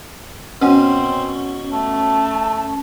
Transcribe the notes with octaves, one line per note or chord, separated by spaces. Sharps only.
B2 C4 C#4
A3 A5